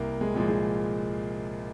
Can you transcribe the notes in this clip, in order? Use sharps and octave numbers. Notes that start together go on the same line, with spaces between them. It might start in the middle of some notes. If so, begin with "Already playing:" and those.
Already playing: C2 A#3
G#3
A#2 F3 G#3
G#3